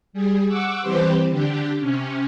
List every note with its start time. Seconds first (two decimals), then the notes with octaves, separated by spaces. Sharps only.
0.13 G3 G#4
0.46 F#5 C#6 D6 E6
0.80 E3 G3 C4 G4 B4 C5
1.29 D3 D4 G4
1.79 C3 C#4